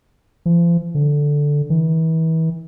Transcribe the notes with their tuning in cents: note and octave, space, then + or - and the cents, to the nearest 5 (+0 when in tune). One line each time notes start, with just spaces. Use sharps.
F3 -40
D3 -5
E3 -35